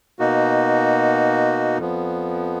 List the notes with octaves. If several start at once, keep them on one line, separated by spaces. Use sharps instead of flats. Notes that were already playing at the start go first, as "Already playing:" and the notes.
B2 A#3 D#4 F#4
F2 F3 B3